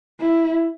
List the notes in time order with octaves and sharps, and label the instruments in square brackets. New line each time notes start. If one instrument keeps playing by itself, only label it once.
[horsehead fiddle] E4